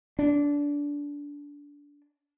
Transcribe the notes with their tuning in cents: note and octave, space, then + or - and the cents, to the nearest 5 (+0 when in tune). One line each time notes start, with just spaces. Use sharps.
D4 -20